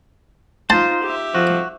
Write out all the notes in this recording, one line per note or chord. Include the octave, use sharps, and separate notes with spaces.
D#4 F4 C5 A5
G4 E5
F3 F#4